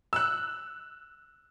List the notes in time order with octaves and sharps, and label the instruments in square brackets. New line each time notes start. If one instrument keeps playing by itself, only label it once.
[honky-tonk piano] E6 F#6